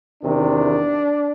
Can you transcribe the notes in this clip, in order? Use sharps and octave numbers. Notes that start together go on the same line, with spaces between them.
E2 C3 D#3 D4